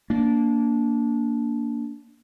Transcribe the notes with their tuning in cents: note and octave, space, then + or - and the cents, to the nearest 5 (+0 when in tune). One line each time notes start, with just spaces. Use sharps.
A#3 +0 D4 -20